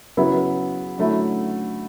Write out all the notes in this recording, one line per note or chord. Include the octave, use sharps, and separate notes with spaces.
C#3 F#3 B3 E4
D3 F#3 A3 E4